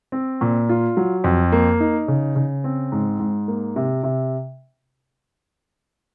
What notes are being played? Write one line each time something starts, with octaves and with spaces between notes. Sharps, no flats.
C4
A#2
F4
F#3
F2
A#3
D#4
C#3
C#3
C4
G#2
G#2
A#3
C3
C3